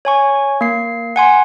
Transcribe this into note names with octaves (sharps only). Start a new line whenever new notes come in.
C#5 G#5 C#6
A#3 C7
F#5 G#5 C6